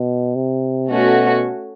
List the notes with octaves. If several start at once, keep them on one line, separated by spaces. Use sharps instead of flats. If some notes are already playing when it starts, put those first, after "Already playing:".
Already playing: B2
C3
B2 A3 C#4 F#4